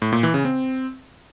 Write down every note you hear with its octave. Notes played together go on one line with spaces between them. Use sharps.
A2
A#2
E3
C#3
C4